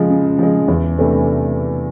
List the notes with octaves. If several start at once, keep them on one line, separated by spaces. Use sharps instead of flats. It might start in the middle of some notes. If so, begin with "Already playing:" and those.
Already playing: C#3 F3 G#3
C#3
F3 G#3
E2
C3 E3 A3 D4